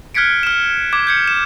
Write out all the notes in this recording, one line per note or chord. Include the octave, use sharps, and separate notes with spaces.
F6 F#6 G#6 B6 C#7 D7
F6 E7
D6 G#6
G6 G#6 C#7
E7